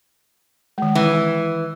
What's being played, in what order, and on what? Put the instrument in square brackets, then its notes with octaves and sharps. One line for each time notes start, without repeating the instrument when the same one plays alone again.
[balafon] D#3 G#3
[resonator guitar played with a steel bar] E3